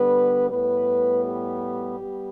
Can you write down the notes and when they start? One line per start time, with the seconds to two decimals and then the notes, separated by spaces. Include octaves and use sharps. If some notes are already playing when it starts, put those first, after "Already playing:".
Already playing: D3 G3 B3 B4
0.50 A2 G3 B3 B4
1.25 G4
1.99 G3 B3